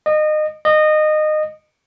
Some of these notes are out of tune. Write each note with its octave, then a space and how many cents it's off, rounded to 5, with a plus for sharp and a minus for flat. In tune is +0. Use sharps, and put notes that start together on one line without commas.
D#5 -25
D#5 -20